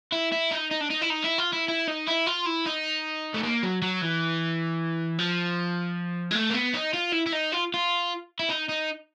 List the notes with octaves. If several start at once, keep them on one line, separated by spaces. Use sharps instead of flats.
E4
E4
D#4
D#4
D4
D#4
E4
D#4
E4
F4
E4
E4
D#4
E4
F4
E4
D#4
A3
A#3
F#3
F#3
E3
F3
G#3
A3
A#3
B3
D#4
F4
E4
E4
D#4
F4
F4
E4
D#4
D#4